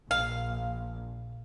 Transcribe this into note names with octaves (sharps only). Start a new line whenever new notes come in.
A#1 F5